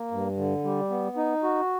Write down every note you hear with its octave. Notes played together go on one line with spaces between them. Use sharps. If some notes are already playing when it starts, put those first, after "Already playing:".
Already playing: A#3
G2
D3
G3
B3
D#4
F#4